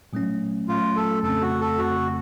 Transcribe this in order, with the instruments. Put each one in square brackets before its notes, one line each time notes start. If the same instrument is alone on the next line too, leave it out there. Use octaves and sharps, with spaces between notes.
[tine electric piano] A#2 F#3 A3 C#4
[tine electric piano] A#2 F#3 A3 C#4 [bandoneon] F4
[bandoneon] A4
[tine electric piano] F2 C#3 A3 C4 [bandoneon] A4
[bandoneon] F#4
A4
[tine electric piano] F2 C#3 A3 C4 [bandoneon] F#4